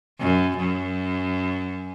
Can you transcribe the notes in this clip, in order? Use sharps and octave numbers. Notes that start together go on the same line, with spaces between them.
F#2
F#2